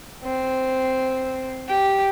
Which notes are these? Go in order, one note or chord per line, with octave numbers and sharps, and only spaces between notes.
C4
G4